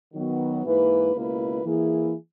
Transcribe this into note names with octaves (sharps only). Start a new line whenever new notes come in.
D#3 F#3 B3 F#4
G#2 E3 A#3 E4 B4
C#2 B2 A#3 E4 B4
E3 A#3 E4 G#4